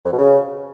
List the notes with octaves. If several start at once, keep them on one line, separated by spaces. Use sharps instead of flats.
F2
B2
C#3